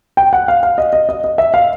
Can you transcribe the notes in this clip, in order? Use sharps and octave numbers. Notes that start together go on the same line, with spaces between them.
G5
F#5
F5
F5
D#5
D#5
D#5
D#5
E5
F5